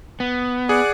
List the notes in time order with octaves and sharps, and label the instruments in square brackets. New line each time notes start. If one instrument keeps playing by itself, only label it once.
[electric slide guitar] B3
[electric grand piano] G#4 [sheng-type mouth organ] D5 F#5